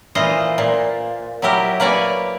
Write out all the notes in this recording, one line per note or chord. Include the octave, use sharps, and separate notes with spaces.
A#2 E3 F4 C5 D#5
A#2
F#3 E4 G4 A#4
A#3 B4 C#5 D5 G#5